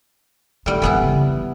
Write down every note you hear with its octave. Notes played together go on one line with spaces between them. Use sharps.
A2 G3 D#4
F1 E3 B3 C4 E4
F2 C#3